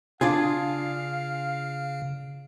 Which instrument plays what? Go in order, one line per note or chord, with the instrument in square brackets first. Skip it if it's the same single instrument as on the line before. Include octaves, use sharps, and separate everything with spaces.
[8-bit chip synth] C#3 [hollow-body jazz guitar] D4 F4 G#4 [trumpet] F5